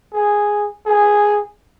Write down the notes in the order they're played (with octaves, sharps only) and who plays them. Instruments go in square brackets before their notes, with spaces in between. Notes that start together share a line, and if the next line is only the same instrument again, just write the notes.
[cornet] G#4
G#4